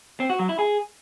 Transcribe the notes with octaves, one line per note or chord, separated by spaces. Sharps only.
C4
F#4
F#3
E4
G#4